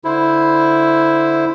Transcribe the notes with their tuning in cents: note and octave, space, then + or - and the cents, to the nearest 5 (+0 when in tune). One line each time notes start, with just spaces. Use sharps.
D3 +5 E4 +0 C5 +0